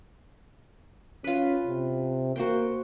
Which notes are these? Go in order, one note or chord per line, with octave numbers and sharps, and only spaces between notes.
C#4 F4 B4
C3
A#3 F#4 C5 G5